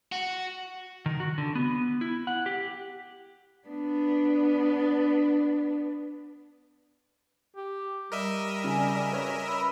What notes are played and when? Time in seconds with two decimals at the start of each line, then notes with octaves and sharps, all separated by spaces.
0.12 F#4
1.06 D#3
1.20 F#4
1.38 D3
1.55 B3
2.01 E4
2.27 F#5
2.46 G4
3.68 B3 D4
7.56 G4
8.12 G3 A#4 D#5 E5
8.64 C#3 G#5
9.12 C#4 F#4 B4 C#5
9.45 B5 C6 E6